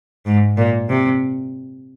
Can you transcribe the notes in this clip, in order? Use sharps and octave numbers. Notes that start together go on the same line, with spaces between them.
G#2
A#2
C3